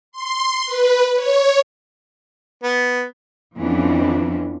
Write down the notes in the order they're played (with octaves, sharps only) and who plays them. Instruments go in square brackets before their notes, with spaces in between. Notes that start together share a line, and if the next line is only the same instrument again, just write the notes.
[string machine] C6
B4
C#5
[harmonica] B3
[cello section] F2 E3 F3 B3 C#4 D4